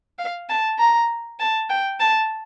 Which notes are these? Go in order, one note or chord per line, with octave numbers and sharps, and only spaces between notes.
F5
A5
A#5
A5
G5
A5